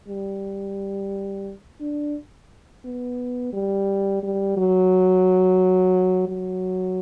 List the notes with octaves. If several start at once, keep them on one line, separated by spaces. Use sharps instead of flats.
G3
D4
B3
G3
G3
F#3
F#3